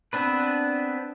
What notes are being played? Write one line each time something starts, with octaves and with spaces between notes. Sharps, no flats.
B3 C4 D4 B4